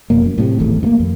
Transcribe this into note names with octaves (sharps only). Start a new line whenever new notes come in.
F1 F2 B2 A#3
F#2
A2 C3
D#1 G#1 E2 A3
G2 A#3
F2